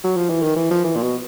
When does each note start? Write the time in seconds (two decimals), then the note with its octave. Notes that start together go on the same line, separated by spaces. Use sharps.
0.04 F#3
0.17 F3
0.30 E3
0.42 D#3
0.56 E3
0.71 F3
0.84 E3
0.96 A#2
1.03 B2